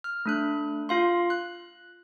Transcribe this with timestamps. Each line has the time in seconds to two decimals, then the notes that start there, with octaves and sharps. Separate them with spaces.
0.04 F6
0.26 A3 D4 F#6
0.89 F4 F5 C6
1.30 F#6